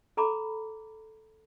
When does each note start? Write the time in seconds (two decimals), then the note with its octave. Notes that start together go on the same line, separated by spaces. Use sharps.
0.17 A4 A#5 B5 D6